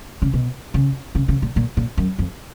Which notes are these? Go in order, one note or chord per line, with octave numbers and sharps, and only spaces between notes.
C#3
B2
C#3
C#3
C#3
A#2
A#2
A#2
F#2
F2